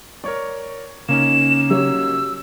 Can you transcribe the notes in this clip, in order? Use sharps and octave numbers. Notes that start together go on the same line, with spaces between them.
A#4 C#5 D5 C#6
C#3 A#3 C#4 D#4 E7
F#3 G4 C#5 E6